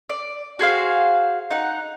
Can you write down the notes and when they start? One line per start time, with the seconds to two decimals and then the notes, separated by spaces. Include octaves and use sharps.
0.09 D5
0.59 F#4 G#4 C5 F5
1.50 D#4 F#5